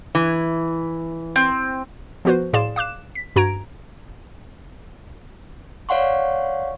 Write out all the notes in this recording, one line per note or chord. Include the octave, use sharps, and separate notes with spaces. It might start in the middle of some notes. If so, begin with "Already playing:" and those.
E3
C4
F3 B3 F#4 B4 C5
A2 G#4 D5 F5 C6 E7
F5 D6 F#6 E7
B6
G2 F#4 A#5 G#6 D7
C#5 D5 F5 F#5 C6 C#6